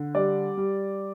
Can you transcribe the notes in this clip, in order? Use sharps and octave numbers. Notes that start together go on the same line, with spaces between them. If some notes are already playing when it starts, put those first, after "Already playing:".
Already playing: D3
G3 D5
G3